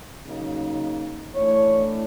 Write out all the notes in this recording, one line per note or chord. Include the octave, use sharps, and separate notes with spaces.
C#3 F#3 A#3 D#4
A2 E3 A3 D4 C#5